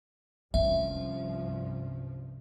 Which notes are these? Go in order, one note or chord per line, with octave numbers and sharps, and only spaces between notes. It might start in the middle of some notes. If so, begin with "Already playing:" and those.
C2 G2 F3 C#4 E5